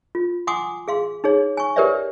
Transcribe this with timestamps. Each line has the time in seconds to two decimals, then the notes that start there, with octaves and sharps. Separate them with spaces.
0.15 F4
0.47 F#5 G#5 C6 D6 D#6
0.88 G#4 F5 C6
1.24 D#4 G#4 C#5
1.57 G#5 C#6
1.76 G4 A#4 B4 C#5 D5 E5